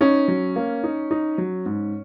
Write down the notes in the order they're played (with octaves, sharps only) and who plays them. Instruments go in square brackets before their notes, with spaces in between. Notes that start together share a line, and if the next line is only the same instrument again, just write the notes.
[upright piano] C#4 [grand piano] D#4
[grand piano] F#3
A#3
D#4
D#4
F#3
G#2